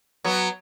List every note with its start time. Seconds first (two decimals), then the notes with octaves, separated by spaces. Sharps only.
0.24 F#3 B3